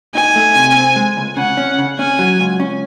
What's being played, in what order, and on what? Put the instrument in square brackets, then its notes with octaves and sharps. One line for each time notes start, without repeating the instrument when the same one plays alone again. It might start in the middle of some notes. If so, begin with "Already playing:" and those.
[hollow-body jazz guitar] D#4 [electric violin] G#5
[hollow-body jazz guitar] A3
C3
C4
G#3
C#2
[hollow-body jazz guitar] C#3 [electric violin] F#5
[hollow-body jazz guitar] C#4
C#3
[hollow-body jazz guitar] C#4 [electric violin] G#5
[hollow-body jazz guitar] F#3
C#2
C#4